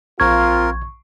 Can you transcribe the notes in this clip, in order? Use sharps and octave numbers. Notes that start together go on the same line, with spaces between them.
A#1 C4 F4 A#4 C#6 G#6